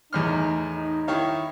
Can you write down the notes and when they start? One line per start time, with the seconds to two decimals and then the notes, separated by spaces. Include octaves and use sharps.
0.13 E2 A2 D#4 F6
0.75 D#4
1.08 D#3 E4 C#5 F5